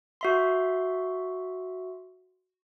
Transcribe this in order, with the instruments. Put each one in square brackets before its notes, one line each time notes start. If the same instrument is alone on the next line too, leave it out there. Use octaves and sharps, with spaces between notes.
[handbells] F#4 E5 C6